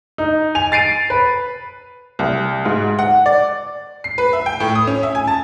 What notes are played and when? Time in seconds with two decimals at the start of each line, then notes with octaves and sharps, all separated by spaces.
0.18 D#4
0.55 G#5 F7
0.72 A6 C7 D7 D#7
1.10 B4
2.19 C2
2.65 G#2
2.99 F#5
3.26 D5
4.04 C7
4.18 B4
4.33 E5
4.46 G5
4.60 A2
4.75 D#6
4.87 C#4
5.03 E5
5.15 G#5
5.27 A5